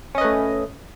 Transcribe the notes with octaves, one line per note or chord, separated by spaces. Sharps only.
A3 C#4 B4 D#5